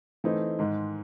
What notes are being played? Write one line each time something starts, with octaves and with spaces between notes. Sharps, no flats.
E3 A3 C4 D#4
G#2 D#3 G#3